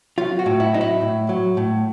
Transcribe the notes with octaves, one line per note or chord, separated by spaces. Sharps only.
F#3 F4
F#4
A2
E4
F#3 D#4
E4
A2
F#3
A2